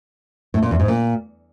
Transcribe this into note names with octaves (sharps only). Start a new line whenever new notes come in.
A2
A#2
E2
G#2
A#2